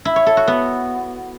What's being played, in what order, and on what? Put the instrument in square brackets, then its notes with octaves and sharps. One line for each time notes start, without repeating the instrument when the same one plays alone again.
[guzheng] E4
C#5
A4
F#4
B3